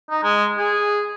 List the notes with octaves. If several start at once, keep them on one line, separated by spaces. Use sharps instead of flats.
D#4
G#3
G#4